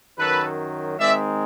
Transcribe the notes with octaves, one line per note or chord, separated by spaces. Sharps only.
F#2 D#3 F#3 A4 B4
D#3 G#3 C4 D#4 D5 E5